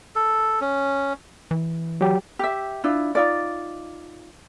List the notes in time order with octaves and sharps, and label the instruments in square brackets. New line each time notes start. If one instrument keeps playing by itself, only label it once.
[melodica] A4
C#4
[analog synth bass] E3
[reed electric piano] F#3 G4
[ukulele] G4 E5
D4 E4 F4
D#4 F4 D5